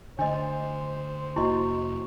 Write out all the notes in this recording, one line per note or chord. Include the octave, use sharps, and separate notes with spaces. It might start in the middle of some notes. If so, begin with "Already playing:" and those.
D3 A3 D4 C5 D#5
F1 A#3 E4 F#4 D#5 C#6